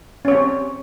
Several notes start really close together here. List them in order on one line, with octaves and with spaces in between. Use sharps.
C#4 C#5 C4 G4